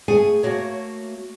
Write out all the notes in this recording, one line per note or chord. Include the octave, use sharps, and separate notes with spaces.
A3 G#4 F#5 G#5
A3 A#3 F#4 C#5